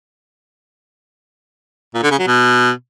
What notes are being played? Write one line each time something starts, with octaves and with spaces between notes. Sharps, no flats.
A#2
D3
C#3
F#3
B2